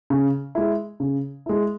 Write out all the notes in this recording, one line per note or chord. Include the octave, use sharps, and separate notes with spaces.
C#3
G#3 E4
C#3
G#3 E4